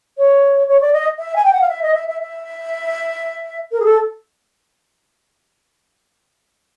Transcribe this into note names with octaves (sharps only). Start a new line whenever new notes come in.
C#5
C#5
D5
D#5
E5
G#5
G5
F#5
F5
E5
D#5
E5
E5
E5
A#4
G#4
A4